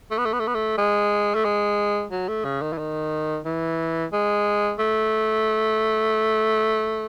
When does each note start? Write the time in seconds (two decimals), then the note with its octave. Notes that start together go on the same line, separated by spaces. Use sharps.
0.11 A3
0.18 B3
0.26 A3
0.33 B3
0.40 A3
0.47 B3
0.54 A3
0.78 G#3
1.34 A3
1.45 G#3
2.12 F#3
2.28 A3
2.45 C#3
2.62 D#3
2.73 E3
2.78 D#3
3.45 E3
4.13 G#3
4.79 A3